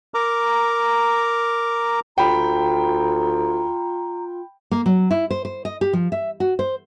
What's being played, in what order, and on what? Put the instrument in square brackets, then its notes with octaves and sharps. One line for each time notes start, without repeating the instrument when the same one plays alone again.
[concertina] A#4 A#5 D6
[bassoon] D2 [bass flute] F4 [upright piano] G5 B5 [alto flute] A#5
[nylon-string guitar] A#3
F#3
E4
C5
C5
D#5
G4
F3
E5
F#4
C5